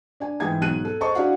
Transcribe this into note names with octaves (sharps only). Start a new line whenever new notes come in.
D4 G#5
G#2 E3 G#4 G5 G#6
B1 G#2 F#6 D#7
A4
G#4 C5 D#5 A5 C#6
D4 E4 F#4 G#4 F5 F#5